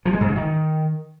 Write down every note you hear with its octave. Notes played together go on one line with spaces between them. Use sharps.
F3
G#3
G#2
C#3
D#3